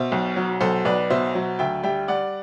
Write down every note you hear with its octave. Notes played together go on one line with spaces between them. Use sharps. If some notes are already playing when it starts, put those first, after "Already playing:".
Already playing: B2 C5 E5
B1
F#3
B1 A4 C5
B1 B4 D5
B2 C5 E5
F#3
D2 E5 G5
G3 E5 G5
G3 D5 F#5